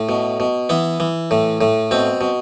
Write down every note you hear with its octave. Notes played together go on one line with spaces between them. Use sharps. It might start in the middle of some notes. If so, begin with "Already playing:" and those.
Already playing: A2
B2
B2
E3 B3
E3
A2
A2
B2 C4
B2